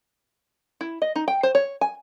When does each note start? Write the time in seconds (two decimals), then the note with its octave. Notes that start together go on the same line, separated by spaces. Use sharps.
0.81 E4
1.02 D#5
1.16 D#4
1.28 G5
1.43 C5
1.55 C#5
1.81 G#5